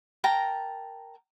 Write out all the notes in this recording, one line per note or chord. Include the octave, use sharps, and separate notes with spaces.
A#4 G5 A5 A#5